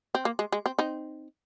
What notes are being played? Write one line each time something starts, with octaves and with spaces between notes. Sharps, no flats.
C4
A#3
G#3
G#3
C4
C4 D#4